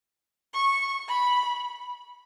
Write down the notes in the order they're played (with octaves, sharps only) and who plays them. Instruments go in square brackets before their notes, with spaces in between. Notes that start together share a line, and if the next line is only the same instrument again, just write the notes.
[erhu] C#6
B5